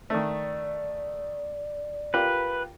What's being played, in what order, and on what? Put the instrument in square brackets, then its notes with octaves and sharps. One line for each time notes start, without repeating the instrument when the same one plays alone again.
[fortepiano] D#3 A3 [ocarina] D5
[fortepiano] F4 G4 A#4 [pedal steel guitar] B4